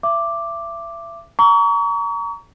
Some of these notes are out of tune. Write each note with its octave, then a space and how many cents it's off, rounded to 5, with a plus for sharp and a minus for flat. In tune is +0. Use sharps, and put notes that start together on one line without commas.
E5 +30 D6 +0
A#5 +0 C#6 +40